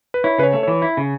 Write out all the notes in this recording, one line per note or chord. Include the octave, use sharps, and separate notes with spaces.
B4
E4 C#5
C#3 B4 C#5
A3
E3 C#5
E4
C#3